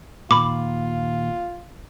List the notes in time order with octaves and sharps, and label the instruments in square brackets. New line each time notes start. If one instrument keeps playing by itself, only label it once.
[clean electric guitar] D#2 A#2 [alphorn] F4 [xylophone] B5 D6